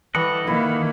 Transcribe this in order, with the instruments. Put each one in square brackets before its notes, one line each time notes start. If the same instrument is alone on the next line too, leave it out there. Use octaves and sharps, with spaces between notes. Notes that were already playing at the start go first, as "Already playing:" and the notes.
[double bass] E3 [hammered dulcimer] G3 C#6 [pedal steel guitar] A4 D#5 F#5
[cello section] D#3 [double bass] A#3 [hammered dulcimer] E4